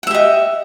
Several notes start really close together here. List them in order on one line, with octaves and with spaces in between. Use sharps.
F#5 E5 G4 D#5